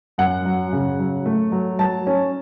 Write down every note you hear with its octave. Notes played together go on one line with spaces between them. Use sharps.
F#2 F#5
F#3
C#3
F#3
A3
F#3
F#3 A5
C#4